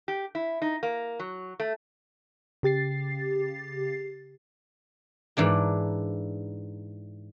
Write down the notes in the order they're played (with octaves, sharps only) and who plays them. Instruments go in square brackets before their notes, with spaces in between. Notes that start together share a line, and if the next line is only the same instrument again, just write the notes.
[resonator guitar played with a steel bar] G4
E4
D#4
A#3
F#3
A3
[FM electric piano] C#3 G4 A6 C7
[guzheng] G#2 E3 D4 A#4